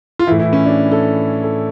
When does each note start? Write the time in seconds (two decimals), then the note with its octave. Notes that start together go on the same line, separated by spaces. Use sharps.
0.19 F4
0.27 A2 E3 E4
0.40 E4
0.53 C#4
0.66 D4
0.92 A4
1.43 A4